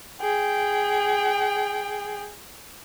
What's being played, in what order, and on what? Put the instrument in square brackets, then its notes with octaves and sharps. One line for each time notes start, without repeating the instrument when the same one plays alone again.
[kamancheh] G#4 G5